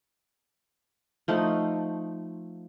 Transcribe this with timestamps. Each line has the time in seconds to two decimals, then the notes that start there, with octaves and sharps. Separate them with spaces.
1.28 F3 A3 D#4 C5